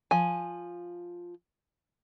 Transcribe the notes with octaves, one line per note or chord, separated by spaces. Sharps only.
F3 G#5